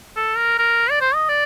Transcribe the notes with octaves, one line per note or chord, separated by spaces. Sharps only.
A4
A#4
A#4
D5
C5
D#5
D5